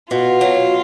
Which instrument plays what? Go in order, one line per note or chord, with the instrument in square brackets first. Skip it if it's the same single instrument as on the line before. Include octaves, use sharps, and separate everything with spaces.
[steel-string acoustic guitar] B2 [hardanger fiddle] F4
[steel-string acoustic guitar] F#3